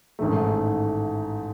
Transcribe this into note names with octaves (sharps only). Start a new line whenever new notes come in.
A1 G#2 D#3 A3